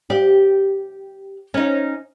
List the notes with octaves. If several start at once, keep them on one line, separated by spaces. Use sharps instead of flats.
G4 D5
C#4 D#4